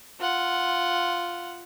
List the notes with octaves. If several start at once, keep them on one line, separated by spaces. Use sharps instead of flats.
F4 F#5